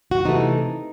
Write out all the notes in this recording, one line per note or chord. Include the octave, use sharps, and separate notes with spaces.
F#4
C3 E3 A3 D#4